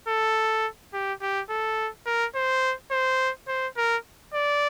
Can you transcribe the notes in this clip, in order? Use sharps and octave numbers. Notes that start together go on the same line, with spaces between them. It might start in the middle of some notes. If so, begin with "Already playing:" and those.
A4
G4
G4
A4
A#4
C5
C5
C5
A#4
D5